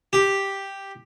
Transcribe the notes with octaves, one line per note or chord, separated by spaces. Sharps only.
G4